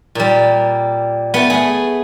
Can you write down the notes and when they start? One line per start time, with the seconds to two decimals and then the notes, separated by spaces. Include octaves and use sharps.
0.15 A#2 G3
1.34 A3 B3
1.50 A3 G#4